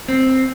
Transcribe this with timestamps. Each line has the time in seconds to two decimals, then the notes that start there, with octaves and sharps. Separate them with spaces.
0.08 C4